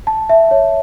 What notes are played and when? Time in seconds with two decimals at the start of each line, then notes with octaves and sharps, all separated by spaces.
0.07 A5
0.29 E5
0.51 C#5